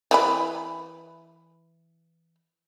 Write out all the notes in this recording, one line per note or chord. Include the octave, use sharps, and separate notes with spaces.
E3 B4 B5